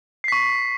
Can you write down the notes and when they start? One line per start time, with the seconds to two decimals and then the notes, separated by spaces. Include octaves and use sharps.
0.24 C7
0.28 B6
0.32 C#6